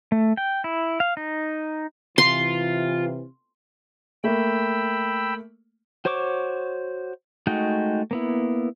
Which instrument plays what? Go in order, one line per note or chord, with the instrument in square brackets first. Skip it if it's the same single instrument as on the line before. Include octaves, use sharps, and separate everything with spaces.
[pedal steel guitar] A3
G5
E4
F5
D#4
[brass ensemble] C3 E3 [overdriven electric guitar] F4 [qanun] C6
[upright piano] A3 A#3 [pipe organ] G5 B5 E6
[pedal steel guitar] F#4 C5 C#5 C#6 D6
G#3 A3 D#4 F#4 G5
A#3 B3 E4